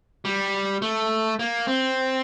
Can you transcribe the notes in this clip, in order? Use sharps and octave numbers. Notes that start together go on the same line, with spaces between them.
G3
A3
A#3
C4